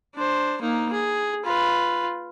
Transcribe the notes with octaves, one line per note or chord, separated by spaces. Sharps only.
D4 C5
A#3 D#4
G#4
F4 B4